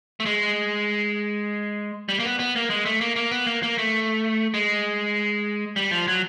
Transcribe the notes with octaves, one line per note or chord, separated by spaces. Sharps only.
A3
G#3
G3
A#3
B3
B3
A#3
G#3
A3
A#3
A#3
B3
A#3
A#3
A3
G#3
G3
F3
F#3